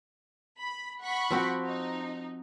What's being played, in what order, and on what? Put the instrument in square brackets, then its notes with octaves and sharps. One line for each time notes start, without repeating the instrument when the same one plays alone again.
[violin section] B5
F#5 B5 C#6
[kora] F3 C4 F#4
[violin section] D#4